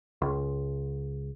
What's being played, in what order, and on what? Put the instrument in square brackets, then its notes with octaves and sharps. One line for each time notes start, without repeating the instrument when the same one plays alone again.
[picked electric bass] C#2